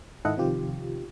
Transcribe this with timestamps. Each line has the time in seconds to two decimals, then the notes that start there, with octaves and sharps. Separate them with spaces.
0.25 G#2 D#3 E4 A4 D#5 F#5
0.37 C3 D#3 F3 F4 G4